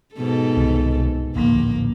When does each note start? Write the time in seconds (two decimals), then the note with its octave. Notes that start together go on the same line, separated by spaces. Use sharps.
0.15 G#2 B2 A4
0.57 C2 D#3
1.35 D1 A#1 D#2 A#3